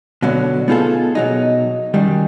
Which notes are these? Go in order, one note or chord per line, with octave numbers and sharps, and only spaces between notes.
B2 D3 F#3 D4
B3 D#4 F4 G#4 A4
B2 F#3 D#4
F#2 D#3 G3